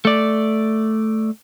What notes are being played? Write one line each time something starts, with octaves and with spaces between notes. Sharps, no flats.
A3 D5